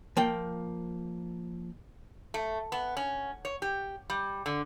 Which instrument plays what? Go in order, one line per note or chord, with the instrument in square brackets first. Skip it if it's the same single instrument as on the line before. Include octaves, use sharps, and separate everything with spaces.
[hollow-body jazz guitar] F3 A#3 G5
[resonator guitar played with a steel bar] A3
B3
C#4
C#5
G4
G3
D3